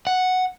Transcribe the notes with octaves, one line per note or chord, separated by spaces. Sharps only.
F#5